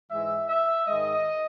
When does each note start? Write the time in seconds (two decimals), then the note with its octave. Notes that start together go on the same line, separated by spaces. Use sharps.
0.11 G#2 E3 G#3 E5
0.49 E5
0.86 G#2 D#3 G#3 D#5